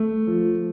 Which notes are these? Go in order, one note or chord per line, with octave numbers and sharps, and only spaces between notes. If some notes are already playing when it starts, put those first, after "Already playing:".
Already playing: A3
F3